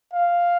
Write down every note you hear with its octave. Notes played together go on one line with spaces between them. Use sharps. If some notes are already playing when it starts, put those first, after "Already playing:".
F5